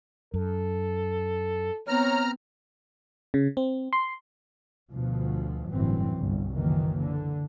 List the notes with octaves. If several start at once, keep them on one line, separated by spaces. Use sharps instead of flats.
F#2 A4
B3 C4 C#5 A#5 F6
C#3
C4
C6
D2 B2 F3
G1 F#2 A2 E3 C4
G1 C2
F#1 D#3 E3 A#3
D3